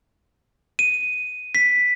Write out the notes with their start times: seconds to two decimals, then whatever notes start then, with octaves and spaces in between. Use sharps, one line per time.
0.79 D#7
1.55 B6